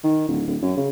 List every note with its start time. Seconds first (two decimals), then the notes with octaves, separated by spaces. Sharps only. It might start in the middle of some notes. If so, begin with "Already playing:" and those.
0.04 D#3
0.28 D1
0.47 D1
0.62 F#2
0.77 C#3